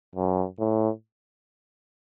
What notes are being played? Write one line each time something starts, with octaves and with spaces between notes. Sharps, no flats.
F#2
A2